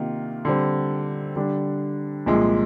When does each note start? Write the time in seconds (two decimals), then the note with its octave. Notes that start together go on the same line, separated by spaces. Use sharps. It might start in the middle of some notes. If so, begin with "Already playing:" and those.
Already playing: C3 D#3 A#3 F4
0.45 D3 G3 C4
1.36 D3 G3 D4
2.26 C2 A#2 F3 G#3